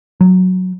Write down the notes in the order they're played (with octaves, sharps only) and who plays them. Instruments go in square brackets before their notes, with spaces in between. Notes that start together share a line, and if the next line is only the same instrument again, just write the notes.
[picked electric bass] F#3